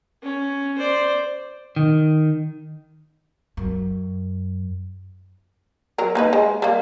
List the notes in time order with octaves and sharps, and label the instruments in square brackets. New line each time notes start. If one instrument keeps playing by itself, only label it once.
[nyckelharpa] C#4
C5 D5
[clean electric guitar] D#3
[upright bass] F#2
[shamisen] F#3 A#4
A#3 D#4 B4
G#3
G3 A#3